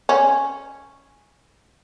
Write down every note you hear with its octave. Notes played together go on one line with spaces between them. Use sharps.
C#4